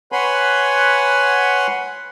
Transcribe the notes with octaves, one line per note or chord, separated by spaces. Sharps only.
B4 C#5 F#5 G#5 B5 C6